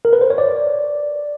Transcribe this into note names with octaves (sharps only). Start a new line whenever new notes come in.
A#4
B4
C5
C#5
D5